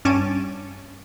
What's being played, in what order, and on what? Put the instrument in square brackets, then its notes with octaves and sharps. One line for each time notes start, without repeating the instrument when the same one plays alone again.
[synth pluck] G2 C#4 A5 C#6 D6 D#7